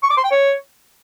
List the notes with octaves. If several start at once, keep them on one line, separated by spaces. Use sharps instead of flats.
C#6
D6
C6
G5
C#5